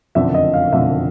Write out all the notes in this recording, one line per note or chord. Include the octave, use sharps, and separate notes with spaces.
F#1 F2 D3 E5
D#5
F5
F#1 F2 D3 E5